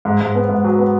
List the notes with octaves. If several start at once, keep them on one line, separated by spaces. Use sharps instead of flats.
G#2
G#2
B3
G#2
F#3
B3